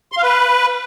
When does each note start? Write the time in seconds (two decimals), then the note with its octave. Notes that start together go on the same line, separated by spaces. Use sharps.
0.12 C6
0.17 F5
0.22 B4